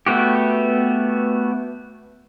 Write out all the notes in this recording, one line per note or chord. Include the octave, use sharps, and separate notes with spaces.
A3 B3 F#4 G4